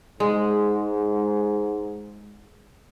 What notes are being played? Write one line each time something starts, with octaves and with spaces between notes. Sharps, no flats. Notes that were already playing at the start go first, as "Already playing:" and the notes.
G#2 G#3